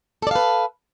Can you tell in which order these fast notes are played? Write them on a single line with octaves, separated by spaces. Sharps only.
A4 D5 F5 B4